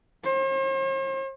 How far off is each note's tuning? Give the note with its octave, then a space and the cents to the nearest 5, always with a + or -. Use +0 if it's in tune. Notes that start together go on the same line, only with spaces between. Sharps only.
C5 +45